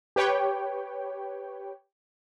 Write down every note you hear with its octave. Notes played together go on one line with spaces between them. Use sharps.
G4 B4 C#5 G5